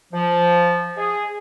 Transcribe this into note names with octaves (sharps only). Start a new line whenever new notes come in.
F3
G#4